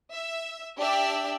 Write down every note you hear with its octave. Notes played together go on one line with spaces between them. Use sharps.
E5
D4 G4 D5 E5